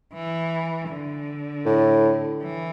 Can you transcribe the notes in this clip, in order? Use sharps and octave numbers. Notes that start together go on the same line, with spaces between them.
E3
D3
A2
E3